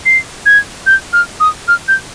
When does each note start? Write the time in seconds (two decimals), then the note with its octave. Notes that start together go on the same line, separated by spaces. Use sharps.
0.06 C7
0.46 G#6
0.86 G6
1.13 F6
1.40 D#6
1.68 F6
1.88 G6